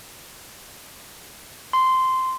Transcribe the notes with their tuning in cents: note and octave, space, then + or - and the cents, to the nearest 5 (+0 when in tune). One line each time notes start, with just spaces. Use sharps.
C6 -10